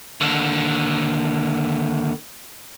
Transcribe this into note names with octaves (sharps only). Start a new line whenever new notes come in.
D#2 D3